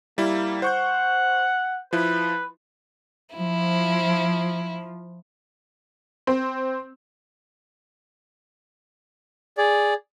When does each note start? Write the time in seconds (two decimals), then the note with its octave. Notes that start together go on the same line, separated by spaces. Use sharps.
0.18 G3 A#3 E4
0.62 C5 F#5 C#6 G6
1.93 F3 E4 B4
3.36 F3 E4
6.27 C4
9.58 G#4 D5